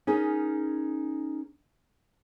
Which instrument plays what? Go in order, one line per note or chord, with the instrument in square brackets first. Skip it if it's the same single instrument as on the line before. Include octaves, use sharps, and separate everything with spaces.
[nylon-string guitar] C#4 D#4 G#4 A#4